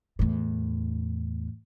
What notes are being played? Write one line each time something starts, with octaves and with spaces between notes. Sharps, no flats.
E2 A2